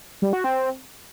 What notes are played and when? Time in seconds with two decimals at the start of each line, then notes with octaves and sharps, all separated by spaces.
0.22 G3
0.33 F#4
0.44 C4